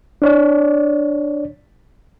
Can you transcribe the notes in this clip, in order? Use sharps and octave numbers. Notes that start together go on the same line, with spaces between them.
D4 C#5 D5